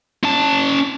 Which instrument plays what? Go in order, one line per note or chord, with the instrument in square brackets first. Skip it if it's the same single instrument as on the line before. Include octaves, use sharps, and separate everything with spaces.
[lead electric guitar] C#4 A5